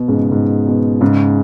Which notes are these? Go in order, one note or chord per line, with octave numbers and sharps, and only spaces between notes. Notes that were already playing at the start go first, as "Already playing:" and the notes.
Already playing: B2
G#2 C#3
G#2
B2
G#2 C#3